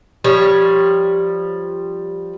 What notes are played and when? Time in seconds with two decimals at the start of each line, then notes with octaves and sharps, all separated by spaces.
0.24 F3 G3 C#5